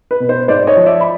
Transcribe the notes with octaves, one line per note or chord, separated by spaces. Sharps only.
B4
B2
C5
G#2 C5 D5
C#5 D#5
F3
D5 E5
B5